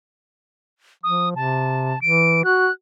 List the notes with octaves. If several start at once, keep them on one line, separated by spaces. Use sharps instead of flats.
F3 D#6
C3 A5
E3 D7
F#4 F#6